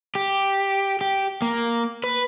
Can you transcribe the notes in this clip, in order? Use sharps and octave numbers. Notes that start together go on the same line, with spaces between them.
G4
G4
A#3
B4